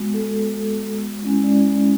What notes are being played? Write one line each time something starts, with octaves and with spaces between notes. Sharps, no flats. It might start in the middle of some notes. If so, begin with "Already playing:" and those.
Already playing: G#3 B3 F#4
A4
G#3 C#4 E4
D5
D5